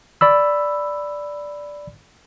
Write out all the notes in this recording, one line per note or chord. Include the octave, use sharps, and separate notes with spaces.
D5 B5 E6